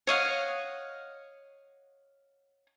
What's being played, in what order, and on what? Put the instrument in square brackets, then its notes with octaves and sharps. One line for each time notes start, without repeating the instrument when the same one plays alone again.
[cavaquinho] C#5 D#5 F5 F#5